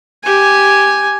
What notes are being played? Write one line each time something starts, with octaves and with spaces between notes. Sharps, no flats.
G4 G#5